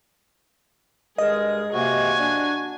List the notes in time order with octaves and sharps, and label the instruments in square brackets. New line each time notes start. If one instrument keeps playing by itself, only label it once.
[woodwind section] G2 G#3 A#4 [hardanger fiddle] G#4 [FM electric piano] D#5
[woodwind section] C3 A#3 [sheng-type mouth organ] F#4 [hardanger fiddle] G#5
[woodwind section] D4